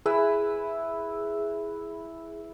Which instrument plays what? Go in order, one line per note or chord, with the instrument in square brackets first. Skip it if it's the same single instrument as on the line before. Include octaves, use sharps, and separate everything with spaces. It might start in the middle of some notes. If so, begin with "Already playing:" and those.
[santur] E4 B4 E5 [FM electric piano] G#4